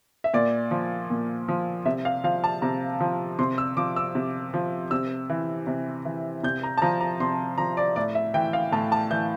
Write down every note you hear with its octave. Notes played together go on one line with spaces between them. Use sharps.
E5
A#2 D5
F3
A#2
F3
C3 E5
F5
F3 F5
A5
C3 A#5
F3
C3 C6
E6
F3 D6
E6
C3
F3
C3 E6
E3
C3
E3
C3 G6
A#5
A5
F3 A#5
A#5
C3 C6
F3 A#5
D5
A2 D5
E5
E3 G5
F5
A2 A5
A5
E3 G6